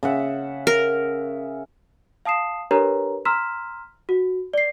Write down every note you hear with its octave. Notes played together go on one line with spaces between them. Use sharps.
C#3 E5 F#5
A#4
F5 A5 D#6 C7 E7
D4 G4 A#4 B4 C#5 A#5
A#5 C6 E6 F6 B6 E7
F#4
D5 C7